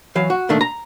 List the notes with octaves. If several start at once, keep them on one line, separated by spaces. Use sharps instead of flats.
E3 F#3 F5
F#4
A#2 D#3 A3 D4
A#5